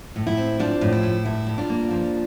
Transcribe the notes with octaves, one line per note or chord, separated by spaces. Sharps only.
A2
E4
C4
F3 D4
A2
E4
A2
G2 E4
G2
D4 F4
A#3
F3